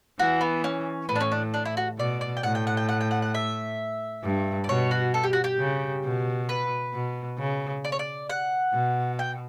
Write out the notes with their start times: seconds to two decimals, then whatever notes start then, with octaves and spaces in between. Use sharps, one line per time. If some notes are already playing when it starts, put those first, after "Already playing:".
0.19 E3 F#4
0.41 B3
0.64 C#4
1.09 A2 B3
1.16 D4
1.20 C#4
1.32 D4
1.54 D4
1.66 E4
1.77 F#4
1.99 B2 D5
2.21 D5
2.37 G5
2.43 A2 F#5
2.55 G5
2.67 F#5
2.77 G5
2.89 F#5
3.01 G5
3.11 F#5
3.22 F#5
3.35 E5
4.23 G2
4.64 D5
4.69 B2 C#5
4.91 F#4
5.14 A4
5.23 G4
5.33 F#4
5.44 G4
5.59 C#3
6.04 B2
6.49 B4
6.94 B2
7.39 C#3
7.85 D5
7.92 C#5
7.99 D5
8.30 F#5
8.73 B2
9.19 G5